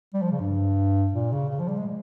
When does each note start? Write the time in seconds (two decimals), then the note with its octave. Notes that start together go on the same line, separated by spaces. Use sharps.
0.14 G3
0.22 F3
0.31 C#3
0.40 G2
1.13 A#2
1.32 C#3
1.49 C#3
1.59 F3
1.68 G3
1.77 G#3